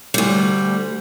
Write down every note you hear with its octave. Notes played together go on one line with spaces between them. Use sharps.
D2 G3